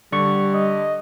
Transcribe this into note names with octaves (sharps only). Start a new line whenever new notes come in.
D3 G3 D5 C#6
D#5